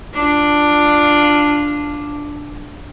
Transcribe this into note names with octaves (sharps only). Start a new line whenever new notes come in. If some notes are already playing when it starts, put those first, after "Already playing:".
D4 F4